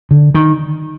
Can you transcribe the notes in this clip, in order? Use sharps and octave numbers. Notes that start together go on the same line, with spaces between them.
D3
D#3